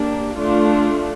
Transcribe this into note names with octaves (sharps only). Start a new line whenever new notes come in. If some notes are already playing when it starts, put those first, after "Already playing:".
Already playing: A#3 D4 G4
A3 D4 F4